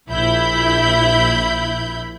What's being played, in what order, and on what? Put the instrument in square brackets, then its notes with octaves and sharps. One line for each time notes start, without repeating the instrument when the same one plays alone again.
[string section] A#1 E4 B5 G6